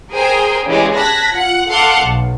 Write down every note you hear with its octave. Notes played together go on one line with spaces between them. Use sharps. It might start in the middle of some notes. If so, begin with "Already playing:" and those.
G#4 A#4 C5 G5 G#5 A#5
C#3 E3 G3 G#3
A5 F#6 G#6 A#6 B6
F4 F#5
A4 F5 F#5 A5 C6 D6
B1